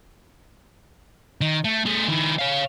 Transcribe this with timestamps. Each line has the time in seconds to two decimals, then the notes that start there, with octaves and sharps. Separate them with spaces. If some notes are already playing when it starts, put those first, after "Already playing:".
1.41 D#3
1.64 A3
1.86 A3 G#4
2.08 D#3 E4
2.38 C#5 F5